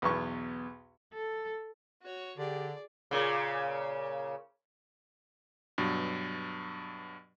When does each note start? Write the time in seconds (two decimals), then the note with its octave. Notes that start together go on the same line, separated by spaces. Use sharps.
0.02 B1 E2 C#6
1.13 A4
2.02 F#4 C#5
2.38 D3 G4 G#4 D5
3.11 A#2 C#3
5.78 G2 B2 F#3